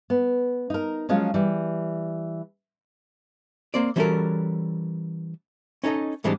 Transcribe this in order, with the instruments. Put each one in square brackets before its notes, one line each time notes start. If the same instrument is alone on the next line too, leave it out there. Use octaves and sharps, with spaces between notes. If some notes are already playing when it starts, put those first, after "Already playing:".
[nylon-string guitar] B3
D#4 A#4
F3 F#3 G#3 C#4 F4
E3 G3
[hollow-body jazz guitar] A#3 C4 D5
E3 G3 C#4 F#4 A4 A#4
C#4 D#4 A4 D#5
G#2 E3 G3 G#3 C4 D4